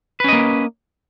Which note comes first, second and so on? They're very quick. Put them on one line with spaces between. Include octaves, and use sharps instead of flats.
B4 C#4 D#5 A#3